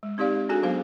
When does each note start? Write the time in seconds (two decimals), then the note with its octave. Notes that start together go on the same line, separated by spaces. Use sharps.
0.03 G#3
0.18 C4 D#4 G4 D5 F5
0.49 D4 F#4 G#4 A4 G#5
0.63 F#3 B3 C5 F5